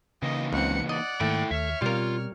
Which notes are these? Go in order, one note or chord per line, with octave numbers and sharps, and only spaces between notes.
C#3 E3 A#3 D#4 D#5
C#2 C4 F#5 C#7
D5 D#5 F#5
G#2 D#3 A3 A#3 E4 G5
D#2 C#5 E5 F6
B2 G3 C4 F4 A#4